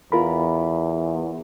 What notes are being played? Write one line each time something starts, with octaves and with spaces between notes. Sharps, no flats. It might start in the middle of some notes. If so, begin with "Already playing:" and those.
E2 F4 A#4 B5